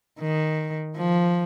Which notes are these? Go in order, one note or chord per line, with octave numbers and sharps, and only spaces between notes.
D#3
F3